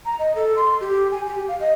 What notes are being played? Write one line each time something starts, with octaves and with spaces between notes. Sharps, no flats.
A#5
D#5
A4
C6
G4
G#5
G4
F5
D#5